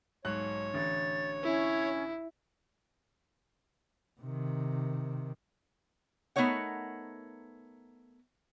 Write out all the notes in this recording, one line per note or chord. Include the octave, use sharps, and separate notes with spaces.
B1 G#2 C#5 F#6
A1 D3 A6
C#4 E4
C3 D#3
A3 B3 D#4 A#4 C#5 F#5